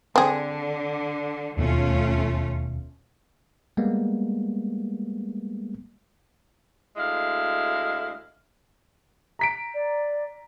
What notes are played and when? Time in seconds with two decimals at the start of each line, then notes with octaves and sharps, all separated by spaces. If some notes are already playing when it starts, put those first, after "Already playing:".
0.16 D3 C4 G#4
1.57 E1 D#2 B2 A3 C#4 F4
3.77 G3 G#3 A#3 B3
6.97 D2 G#3 E4 F5
9.39 A#5 B6 D7
9.74 D5